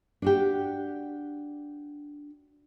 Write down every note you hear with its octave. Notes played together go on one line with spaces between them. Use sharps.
D4 F#4 G4